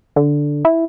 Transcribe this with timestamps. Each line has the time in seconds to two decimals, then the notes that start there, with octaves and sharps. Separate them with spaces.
0.16 D3
0.65 E4